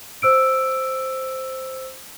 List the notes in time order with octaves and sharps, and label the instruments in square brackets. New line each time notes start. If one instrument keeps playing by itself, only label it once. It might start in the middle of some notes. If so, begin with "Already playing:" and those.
[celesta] C5 E6 D7